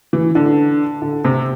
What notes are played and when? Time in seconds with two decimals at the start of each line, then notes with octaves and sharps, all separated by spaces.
0.13 E3
0.35 D3
1.02 D3
1.25 C3